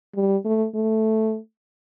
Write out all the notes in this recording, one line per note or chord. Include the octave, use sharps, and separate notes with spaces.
G3
A3
A3